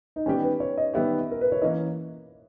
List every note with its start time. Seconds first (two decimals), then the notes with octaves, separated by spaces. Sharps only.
0.16 D#4
0.26 D#3 G3 B3 C#4 G4
0.43 B4
0.60 C#5
0.78 D#5
0.94 D#3 G3 B3 G4 E5
1.31 A#4
1.41 B4
1.52 C#5
1.62 E3 A#3 C#4 D#5